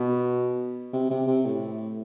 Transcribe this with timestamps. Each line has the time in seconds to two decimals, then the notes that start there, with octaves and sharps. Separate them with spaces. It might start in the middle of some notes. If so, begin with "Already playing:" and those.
Already playing: B2
0.93 C3
1.10 C3
1.27 C3
1.45 A2